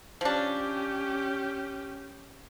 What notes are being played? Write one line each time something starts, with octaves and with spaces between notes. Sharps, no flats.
F3 C#4 D4 G4